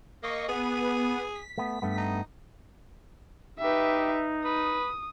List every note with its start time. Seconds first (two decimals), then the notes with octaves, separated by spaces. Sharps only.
0.23 A#3 D#5 C#6
0.48 B3 G#4 D#7
1.35 B6
1.58 A3 B3
1.82 G2 A3 B3
1.97 D#4
3.59 D#4 G4 B4 E5
4.45 B4 D#6